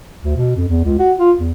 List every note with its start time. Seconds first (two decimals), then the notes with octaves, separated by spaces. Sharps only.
0.24 D2
0.37 B2
0.56 F2
0.68 E2
0.84 C#2
0.99 F#4
1.19 F4
1.39 E2